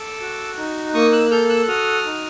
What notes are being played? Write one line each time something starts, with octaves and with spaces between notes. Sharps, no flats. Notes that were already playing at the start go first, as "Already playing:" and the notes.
Already playing: A4 D6 E6
F#4
D#4
A#3 C#6 D#6
E6 F#6
A4 F6 G6
E6 F#6
F#4 D#6 F6
D#4